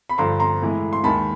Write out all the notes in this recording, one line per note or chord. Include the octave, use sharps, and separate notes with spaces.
B5
G2 D3 F3 A#5 C6
A#5 C6
A2 E3 G#3
C6
D#2 D#3 G#3 A5 B5